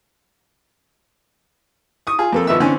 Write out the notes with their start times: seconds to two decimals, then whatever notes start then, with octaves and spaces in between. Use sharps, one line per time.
2.07 C#6 D#6
2.19 F4 G#4
2.33 F2 A#3 A4
2.47 G#1 F3 B3 E5 E6
2.60 D3 E3 C4 C#4